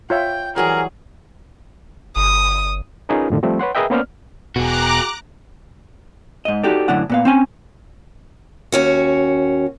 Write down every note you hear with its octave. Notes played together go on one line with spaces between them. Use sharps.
F4 C#5 E5 G5
E3 F#3 G3 G#4 A#4
G1 D#6
C#4 D#4 F4 G#4 A#4 B4
F2 A2 D3 D#3
F3 G3 A3 C4
B4 C#5 F#5 C6
G#4 A#4 B4 D#5 E5 G5
A#3 B3 C#4 C5 D5 F6
E1 B2 F#4 G#4 A#5 D6 F#6
G#2 D#5
D#4 F#4 G4 A4 D5
F#2 A2 D3 D4 F#5
A#2 B3 F5
C4 C#4 G#5
D#2 C#4 F#4